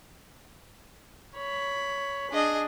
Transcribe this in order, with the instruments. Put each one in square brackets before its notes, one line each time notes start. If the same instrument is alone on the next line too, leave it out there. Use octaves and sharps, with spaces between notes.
[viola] C#5 B5
[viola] D4 [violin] G#4 D#5